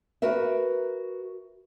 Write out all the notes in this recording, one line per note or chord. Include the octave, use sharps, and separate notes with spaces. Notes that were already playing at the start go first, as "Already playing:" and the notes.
F#4 A#4 B4 E5